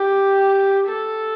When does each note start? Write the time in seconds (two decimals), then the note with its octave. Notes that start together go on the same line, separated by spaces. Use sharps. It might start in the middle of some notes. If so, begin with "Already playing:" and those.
Already playing: G4
0.87 A4